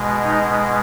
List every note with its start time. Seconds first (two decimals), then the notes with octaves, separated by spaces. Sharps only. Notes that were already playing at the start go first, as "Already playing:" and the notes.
Already playing: B2 G#3
0.23 D#4